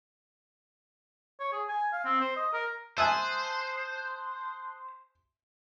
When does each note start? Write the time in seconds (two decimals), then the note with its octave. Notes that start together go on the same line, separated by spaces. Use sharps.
1.40 C#5
1.53 G#4
1.69 G#5
1.93 F5
2.05 C4
2.21 C5
2.36 D#5
2.53 A#4
2.98 C5 E5 G#5 A5 D#6 F#6